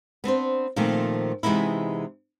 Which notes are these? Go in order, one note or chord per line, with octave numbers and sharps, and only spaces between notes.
B3 C4 D4 C5
A#2 D#3 F3 A3 C4
C3 E3 G#3 B3 D#4 E4